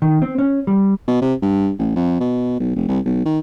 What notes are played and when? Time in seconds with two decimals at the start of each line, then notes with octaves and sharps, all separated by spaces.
0.02 D#3
0.22 C4
0.38 C#4
0.67 G3
1.08 B2
1.22 C3
1.42 G2
1.79 A1
1.96 F2
2.20 B2
2.60 B1
2.76 F1
2.88 C2
3.06 B1
3.25 D#3